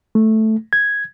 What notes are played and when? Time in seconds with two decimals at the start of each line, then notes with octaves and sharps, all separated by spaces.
0.15 A3
0.73 G#6